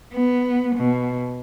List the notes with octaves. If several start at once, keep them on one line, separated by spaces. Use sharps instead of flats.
B3
B2